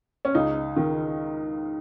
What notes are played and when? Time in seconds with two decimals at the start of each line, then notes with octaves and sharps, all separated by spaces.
0.25 C#4
0.35 C#2 D#4
0.77 D#3